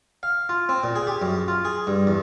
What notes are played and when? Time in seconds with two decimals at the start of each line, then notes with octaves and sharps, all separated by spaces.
0.23 F5
0.49 F4
0.69 C4
0.84 A#2
0.96 G#4
1.07 G4
1.22 F#2
1.48 F4
1.65 G#4
1.87 G2
2.07 E2